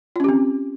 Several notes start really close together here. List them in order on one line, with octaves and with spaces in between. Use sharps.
F4 C#4 G4 C4